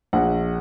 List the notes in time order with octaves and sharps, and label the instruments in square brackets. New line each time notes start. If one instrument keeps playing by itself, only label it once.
[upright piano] A#1 F#5